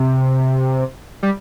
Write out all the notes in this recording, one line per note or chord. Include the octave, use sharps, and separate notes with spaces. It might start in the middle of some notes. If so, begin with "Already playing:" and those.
Already playing: C3
G3